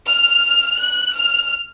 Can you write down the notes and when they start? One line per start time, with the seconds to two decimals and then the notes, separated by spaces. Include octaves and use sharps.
0.09 F6
0.80 F#6
1.16 F6